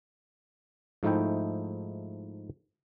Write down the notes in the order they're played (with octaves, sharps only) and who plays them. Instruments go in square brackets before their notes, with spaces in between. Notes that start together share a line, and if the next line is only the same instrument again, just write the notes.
[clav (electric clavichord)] G#2 F3 A3 D#4 E4 G5